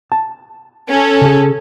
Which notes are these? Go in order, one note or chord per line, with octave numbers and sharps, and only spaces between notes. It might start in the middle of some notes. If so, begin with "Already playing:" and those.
A5
C#4 A4
C#3 G#4